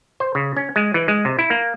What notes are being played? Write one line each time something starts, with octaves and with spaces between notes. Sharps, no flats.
C5
C#3
C#4
G#3
E3
G#3
C3
E4
A#3